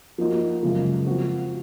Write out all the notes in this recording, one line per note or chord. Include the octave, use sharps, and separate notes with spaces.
F3 A#3 D#4 F#4
F#2 C#3 F3 G#3
F3 C4 F#4